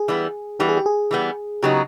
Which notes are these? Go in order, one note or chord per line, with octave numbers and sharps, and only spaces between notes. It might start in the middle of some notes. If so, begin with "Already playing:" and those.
Already playing: G#4
E3 G3 B3
E3 G3 B3 G4
G#4
G4
G#4
E3 G3 B3
C#3 F#3 B3 D#4 G4